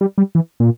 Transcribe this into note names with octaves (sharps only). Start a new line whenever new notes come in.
G3
G3
E3
A#2